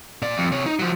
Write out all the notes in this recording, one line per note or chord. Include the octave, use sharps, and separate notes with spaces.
A#2 D5
F2
C3 C#5
D#4
F3 F#3